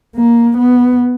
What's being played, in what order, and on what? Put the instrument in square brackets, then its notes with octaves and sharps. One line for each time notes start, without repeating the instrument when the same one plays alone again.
[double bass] A#3
B3